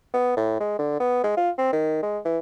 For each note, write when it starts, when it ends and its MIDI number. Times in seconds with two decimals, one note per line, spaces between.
0.14 0.35 59
0.37 0.57 45
0.60 0.78 56
0.79 0.95 50
1.00 1.23 59
1.24 1.35 56
1.37 1.50 65
1.58 1.70 60
1.72 2.03 51
2.03 2.19 56
2.25 2.39 52